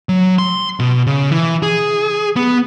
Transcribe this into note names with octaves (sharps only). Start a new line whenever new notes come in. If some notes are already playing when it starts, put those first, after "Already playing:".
F#3
C6
B2
C#3
E3
G#4
B3